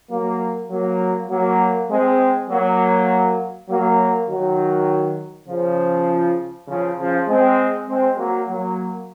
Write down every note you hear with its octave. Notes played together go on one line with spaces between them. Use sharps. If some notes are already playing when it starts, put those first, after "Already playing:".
F#3 A#3
F#3 A#3
F#3 A#3
G#3 C4
F#3 A#3
F#3 A#3
D#3 F#3
C#3 F3
C#3 F3
C#3 F3
G#3 C4
G#3 C4
F#3 A#3
F#3 A#3